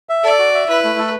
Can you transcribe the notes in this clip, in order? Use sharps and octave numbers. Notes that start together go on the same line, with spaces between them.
E5
A4 D5
F#4
E5
E4 B4
A3
A4